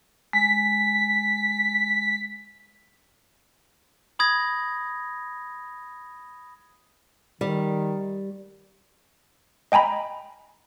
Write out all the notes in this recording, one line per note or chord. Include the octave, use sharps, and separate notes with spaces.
G#3 B6
B5 D#6 G#6 A#6
D#3 G3
D#5 G5 G#5 A#5 B5